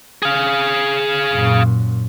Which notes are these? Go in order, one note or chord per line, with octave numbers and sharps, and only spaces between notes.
G#4 F5
F#2 A#2